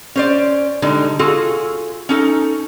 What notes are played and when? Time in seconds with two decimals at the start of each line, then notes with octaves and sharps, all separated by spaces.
0.16 C#4 C5 D5
0.82 D3 G3 G#3 D#4
1.19 F4 F#4 G#4 A4
2.09 C#4 D#4 A4